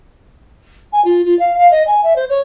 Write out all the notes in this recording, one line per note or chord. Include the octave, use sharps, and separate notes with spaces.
G#5
F4
F4
F5
F5
D#5
G#5
E5
C5
C#5